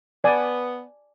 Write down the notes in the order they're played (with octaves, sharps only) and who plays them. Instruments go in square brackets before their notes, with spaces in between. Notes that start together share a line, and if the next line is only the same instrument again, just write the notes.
[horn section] B3 [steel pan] D5 G#5